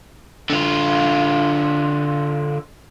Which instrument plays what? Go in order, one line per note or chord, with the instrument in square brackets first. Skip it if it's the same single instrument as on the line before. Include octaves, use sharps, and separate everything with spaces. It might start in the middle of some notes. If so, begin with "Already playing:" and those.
[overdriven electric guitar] D3 F4